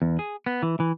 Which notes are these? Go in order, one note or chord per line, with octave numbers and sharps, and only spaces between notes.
E2
G#4
B3
E3
E3